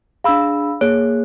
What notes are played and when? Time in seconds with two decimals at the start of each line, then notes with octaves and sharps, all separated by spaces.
0.24 D4 G#4 F5 B5 E6
0.81 A#3 G#4 C#5